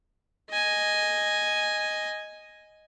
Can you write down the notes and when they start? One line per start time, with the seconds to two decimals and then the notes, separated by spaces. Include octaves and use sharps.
0.50 D#5 G#5